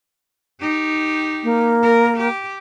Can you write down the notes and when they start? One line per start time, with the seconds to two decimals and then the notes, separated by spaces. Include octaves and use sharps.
0.60 D#4 G4
1.44 A#3
1.83 A#4
2.17 G4